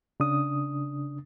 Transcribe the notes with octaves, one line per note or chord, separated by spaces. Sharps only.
C#3 D4 D#6